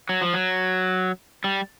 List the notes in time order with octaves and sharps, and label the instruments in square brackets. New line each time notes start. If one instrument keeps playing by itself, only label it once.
[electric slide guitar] F#3
F3
F#3
G3